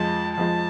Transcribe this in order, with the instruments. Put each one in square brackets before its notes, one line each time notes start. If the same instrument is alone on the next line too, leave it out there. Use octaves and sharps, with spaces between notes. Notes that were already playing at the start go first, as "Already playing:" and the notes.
Already playing: [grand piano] F2 F3 G#3 [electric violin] A5
[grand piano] F2 F3 G#3 [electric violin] A5